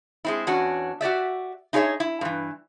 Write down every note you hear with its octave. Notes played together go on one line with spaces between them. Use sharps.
G#3 C4 E4
E2 C#4 D4 F#4
F#4 G4 D5 E5
D#4 E4 G#4 A4 C#5 E5
E4
G2 E3